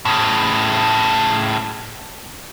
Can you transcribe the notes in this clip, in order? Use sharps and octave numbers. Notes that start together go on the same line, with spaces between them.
A2 C#3